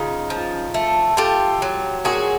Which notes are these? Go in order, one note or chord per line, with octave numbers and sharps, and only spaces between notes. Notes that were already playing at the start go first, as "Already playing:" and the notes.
Already playing: C#3 D#4 F4
F3
A3
A3 F4 G4
F#3
A#2 F#4 G#4